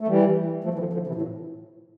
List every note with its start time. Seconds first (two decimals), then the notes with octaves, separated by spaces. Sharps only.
0.01 A3
0.07 E3 G3
0.64 F3 A3
0.74 E3
0.79 D3 F3
0.93 D3 F3
1.07 C3 E3
1.15 A2
1.22 A#2